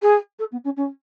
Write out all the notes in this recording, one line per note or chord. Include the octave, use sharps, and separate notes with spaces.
G#4
A4
B3
C#4
C#4